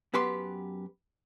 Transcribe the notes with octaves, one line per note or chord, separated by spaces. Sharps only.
F#2 B3 G4 B4 C6